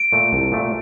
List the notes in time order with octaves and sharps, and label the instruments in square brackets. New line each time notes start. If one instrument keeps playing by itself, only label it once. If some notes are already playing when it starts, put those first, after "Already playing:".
Already playing: [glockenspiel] D7
[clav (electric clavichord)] A#2 A3
C2
A#2 A3